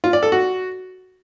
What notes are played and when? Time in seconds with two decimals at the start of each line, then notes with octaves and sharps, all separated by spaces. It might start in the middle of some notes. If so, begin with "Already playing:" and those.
0.04 F4
0.13 D5
0.23 A4
0.32 F#4